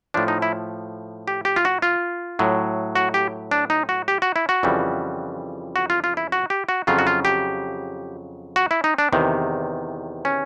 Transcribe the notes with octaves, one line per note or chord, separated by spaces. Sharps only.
A2 F3 D4
D#4
E4
G4
G4
F4
F#4
F4
A2 F#3
F#4
G4
D4
D#4
F#4
G4
F#4
E4
F#4
F2 C#3 E3 G3
F#4
F4
F4
E4
F#4
G4
F#4
F2 C#3 F#3 F4
F#4
F4
G4
F#4
E4
D#4
D4
E2 C3 D#3
C#4